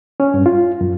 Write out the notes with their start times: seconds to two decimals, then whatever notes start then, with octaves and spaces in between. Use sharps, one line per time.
0.20 C#4
0.34 G2
0.46 F4
0.81 F#2